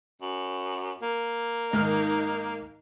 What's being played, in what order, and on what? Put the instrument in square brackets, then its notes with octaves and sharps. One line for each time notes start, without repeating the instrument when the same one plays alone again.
[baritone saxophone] F#2
A#3
[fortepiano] G#2 D#3 F6 [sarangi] D#4